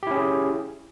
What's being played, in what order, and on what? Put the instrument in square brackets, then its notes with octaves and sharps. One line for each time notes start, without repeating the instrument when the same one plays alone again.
[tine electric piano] G4
E4
C#4
G#4